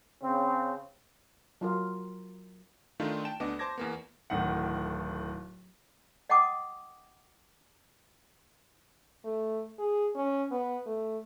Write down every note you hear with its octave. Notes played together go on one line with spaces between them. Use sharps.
C#3 C4
F#3 F4 A#4
D#3 A3 D4 D#4 F4
G5 A5 E7
D2 B3 D4 D#5 D6
C5 A5 D6 G#6 A#6
E2 A#3 B3
D1 A2 D#3 F#5
D#5 F#5 G5 A5 D6 D#6
A3
G#4
C#4
B3
A3